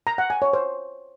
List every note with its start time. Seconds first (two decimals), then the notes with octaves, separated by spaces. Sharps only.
0.07 A#5
0.18 F#5
0.30 G#5
0.42 C#5
0.53 C5